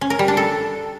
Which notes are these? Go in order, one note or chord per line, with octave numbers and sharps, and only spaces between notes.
C#4
A#4
G3
D4
A4